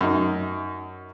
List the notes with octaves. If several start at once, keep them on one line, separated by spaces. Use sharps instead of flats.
F#2 D#4